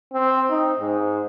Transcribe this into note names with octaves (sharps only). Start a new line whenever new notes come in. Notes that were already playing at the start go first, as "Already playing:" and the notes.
C4
D#4
G#2